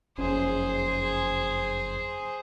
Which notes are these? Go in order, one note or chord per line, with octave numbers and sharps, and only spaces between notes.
F#1 F2 C#4 G#4 C5